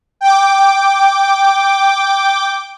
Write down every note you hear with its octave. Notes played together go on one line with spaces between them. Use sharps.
G5 D6